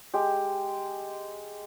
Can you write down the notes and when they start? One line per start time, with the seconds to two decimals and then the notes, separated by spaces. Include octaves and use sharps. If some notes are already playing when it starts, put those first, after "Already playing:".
0.14 G#3 G4